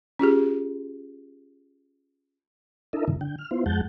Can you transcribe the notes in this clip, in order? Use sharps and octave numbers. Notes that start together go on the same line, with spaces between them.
C#4 F4 G4 G#4
D4 E4 A4 A#4 D#5 E5
G2 C3 D#3 E3
D3 G5
F6
B3 E4 F4 C5
F2 G#3 F#5 A5 G6